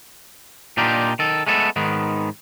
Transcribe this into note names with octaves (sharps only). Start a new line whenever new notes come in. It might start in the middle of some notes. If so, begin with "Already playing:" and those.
A#2 D4 D#4 F4 G4
D#3 A4
G#3 A3 B3 A4
G#2 D#3 B3